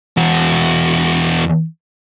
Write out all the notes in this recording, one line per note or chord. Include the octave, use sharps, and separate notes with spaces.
E2 F#4